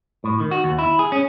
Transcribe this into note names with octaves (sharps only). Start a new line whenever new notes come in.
A2
D#3
F#4
D#2
E4
G#4
C#4